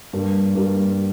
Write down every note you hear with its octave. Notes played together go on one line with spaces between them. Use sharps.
G2 G3 A#3
G2 G3 A#3